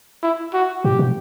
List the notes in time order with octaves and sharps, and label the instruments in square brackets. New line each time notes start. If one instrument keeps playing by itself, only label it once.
[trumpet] E4
F#4
[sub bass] A2 [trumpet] G4
[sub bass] B2